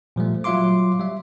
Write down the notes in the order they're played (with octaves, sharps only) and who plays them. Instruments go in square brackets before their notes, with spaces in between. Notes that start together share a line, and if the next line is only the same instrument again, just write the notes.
[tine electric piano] A#2 F3 G3 A3
F#3 F4 E5 F5 C6 D6
G3 E5